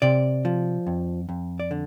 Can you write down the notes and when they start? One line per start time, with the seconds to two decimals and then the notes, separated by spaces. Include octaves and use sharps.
0.02 C3 D5
0.45 F3
0.87 F2
1.29 F2
1.60 D5
1.71 D3